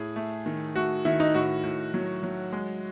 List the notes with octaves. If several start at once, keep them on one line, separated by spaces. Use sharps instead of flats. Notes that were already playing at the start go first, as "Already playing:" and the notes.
Already playing: A2 G#4
A3
D#3
A3 F#4
D#3 E4
D#4
A2 F#4
A2
F#3
F#3
G#3